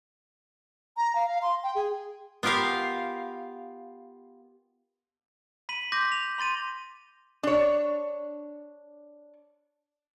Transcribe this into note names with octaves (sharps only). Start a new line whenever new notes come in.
A#5
F5
F5
C6
G5
G#4
B3 F4 G4 A#4 F5
B5 B6 D#7 F#7
C6 D6 G6 A#6 B6
F7
B5 C6 A6 D#7
D4 C#5